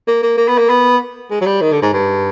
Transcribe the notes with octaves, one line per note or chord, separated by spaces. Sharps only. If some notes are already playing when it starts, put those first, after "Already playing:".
A#3
A#3
A#3
B3
A#3
B3
G#3
F#3
G3
D#3
D3
G#2
G2